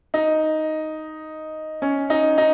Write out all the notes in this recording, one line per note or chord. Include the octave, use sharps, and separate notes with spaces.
D#4
C#4
D#4
D#4